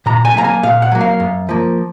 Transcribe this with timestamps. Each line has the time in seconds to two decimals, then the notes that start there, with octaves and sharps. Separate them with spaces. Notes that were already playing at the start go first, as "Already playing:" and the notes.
0.06 A#2 A#5
0.25 G#5
0.34 F#3 A#3 A#5
0.44 G#5
0.63 A#2 F5
0.82 F#5
0.91 F#3 A#3
1.01 F5
1.20 F#2
1.49 F3 A#3